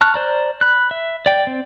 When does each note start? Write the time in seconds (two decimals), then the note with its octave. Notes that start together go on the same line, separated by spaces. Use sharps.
0.01 A5 C#6 F6 F#6
0.14 C5 D5 A#5
0.61 B5 F#6
0.91 E5
1.26 D5 G5
1.47 C4